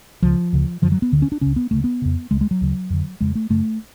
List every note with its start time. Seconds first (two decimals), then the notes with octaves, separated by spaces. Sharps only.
0.22 C#2 C#3 F3
0.53 D2 C#3
0.82 F#2 D3 F3
0.92 F#3
1.02 B3
1.12 D2 D3
1.22 C#4
1.32 D4
1.41 C#2 C#3 C#4
1.56 B3
1.71 D2 C#3 A3
1.84 B3
2.02 F2 C#3
2.31 C#2 C#3 G#3
2.41 G#3
2.51 F#3
2.61 D2 C#3
2.90 F2 D3
3.21 F2 C#3 G#3
3.35 A3
3.50 F#2 C#3 A3